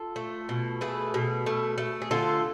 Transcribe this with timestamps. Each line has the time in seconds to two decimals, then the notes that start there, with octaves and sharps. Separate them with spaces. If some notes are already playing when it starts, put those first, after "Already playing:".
Already playing: F4 A4
0.16 A3
0.49 B2
0.81 A3 G#4 B4
1.14 B2
1.46 A3
1.78 A3
2.02 G#4
2.11 D3 F4 A4